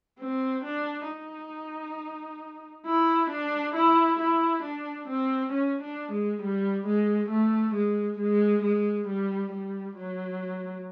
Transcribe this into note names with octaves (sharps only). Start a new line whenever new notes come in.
C4
D4
D#4
E4
D4
E4
E4
D4
C4
C#4
D4
G#3
G3
G#3
A3
G#3
G#3
G#3
G3
G3
F#3